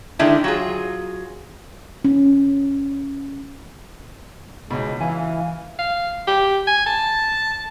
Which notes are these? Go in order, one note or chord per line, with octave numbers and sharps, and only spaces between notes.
D3 D#3 G#3 D4 E4
F#3 F4 G#4
C#4
C#2 B2 G#3
E3 F5 G#5
F5
G4
G#5
A5